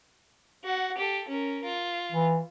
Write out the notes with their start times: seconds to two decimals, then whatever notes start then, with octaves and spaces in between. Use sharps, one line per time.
0.64 F#4 F#5
0.97 G4 A4
1.28 C#4 A#4
1.64 F4
2.12 E3